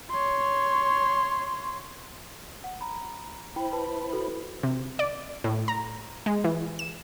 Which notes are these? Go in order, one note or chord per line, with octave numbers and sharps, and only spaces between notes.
C#5 C6
F#5
A#5 B5
E4 C5 G5 B5
B4 A5
F#4 A4 B4
C3
D5
A2
A#5
G#3
E3
E7